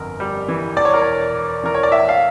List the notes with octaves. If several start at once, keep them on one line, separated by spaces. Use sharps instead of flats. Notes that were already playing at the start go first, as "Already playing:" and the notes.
Already playing: G1 F2 A#4
G3
E3
E2 D5
C#5
A#4
E1 C#5
E1
E3 A#4
C#5
D5
A2 E5
F5